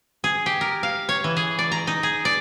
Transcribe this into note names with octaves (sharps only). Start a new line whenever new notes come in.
G#4
G4
A#4
F5
C#5
E3
G#4
D5
A#5
D#4
G#4
D5